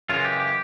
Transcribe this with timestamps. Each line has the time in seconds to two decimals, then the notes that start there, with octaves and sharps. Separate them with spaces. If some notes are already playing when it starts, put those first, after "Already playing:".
0.09 F#2 C#3 E3 G#3 F4
0.25 G4
0.40 G4